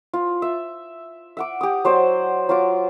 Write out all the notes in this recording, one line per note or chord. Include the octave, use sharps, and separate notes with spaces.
F4
E5
E5 F#5 D6
G4 D#6
F#3 C5 D5
F#3 F4 D6